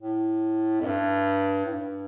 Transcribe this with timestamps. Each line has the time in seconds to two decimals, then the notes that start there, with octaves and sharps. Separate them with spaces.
0.01 A2
0.81 F2
0.86 G2
1.66 A2
1.71 G2